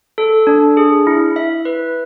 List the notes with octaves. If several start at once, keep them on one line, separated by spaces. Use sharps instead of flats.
A4
D4
G#4
E4
E5
B4